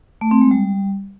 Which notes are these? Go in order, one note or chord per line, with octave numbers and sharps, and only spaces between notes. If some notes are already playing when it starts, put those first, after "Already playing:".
A3
C4
G#3
G3